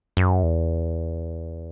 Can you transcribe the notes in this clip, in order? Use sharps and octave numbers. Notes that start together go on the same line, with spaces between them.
F#2
E2